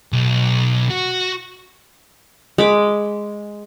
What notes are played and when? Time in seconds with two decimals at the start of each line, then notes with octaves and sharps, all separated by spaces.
0.13 B1
0.90 F#4
2.58 G#3 B5 D6